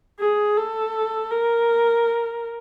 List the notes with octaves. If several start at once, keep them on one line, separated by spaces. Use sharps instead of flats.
G#4
A4
A#4